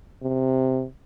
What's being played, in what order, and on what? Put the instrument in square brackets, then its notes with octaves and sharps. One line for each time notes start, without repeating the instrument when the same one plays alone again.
[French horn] C3